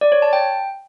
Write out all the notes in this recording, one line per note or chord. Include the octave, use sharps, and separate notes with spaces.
D5
C#5
A5
G5